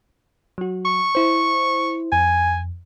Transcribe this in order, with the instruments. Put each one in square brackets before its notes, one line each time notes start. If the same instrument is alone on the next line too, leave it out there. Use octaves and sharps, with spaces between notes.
[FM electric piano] F#3 F#4
[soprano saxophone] C#6
[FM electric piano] E4 C5
[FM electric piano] F2 [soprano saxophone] G#5